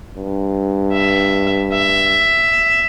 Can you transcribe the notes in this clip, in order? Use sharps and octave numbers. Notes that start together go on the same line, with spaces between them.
G2
E5
E5